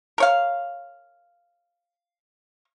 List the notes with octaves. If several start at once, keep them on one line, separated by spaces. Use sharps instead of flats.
A#4 C#5 F5